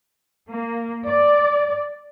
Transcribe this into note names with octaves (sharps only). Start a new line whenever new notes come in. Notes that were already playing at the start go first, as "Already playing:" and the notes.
A#3
D5